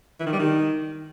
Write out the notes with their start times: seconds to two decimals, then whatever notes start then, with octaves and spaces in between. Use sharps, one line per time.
0.20 E3
0.26 D#3
0.33 G3
0.39 D#3